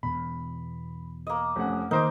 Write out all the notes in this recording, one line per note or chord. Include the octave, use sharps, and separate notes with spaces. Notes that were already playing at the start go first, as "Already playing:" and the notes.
E2 B2 B5
A#3 D#5
F1 C#4 F#5
D#3 A#3 D#4 A#4 C5 D6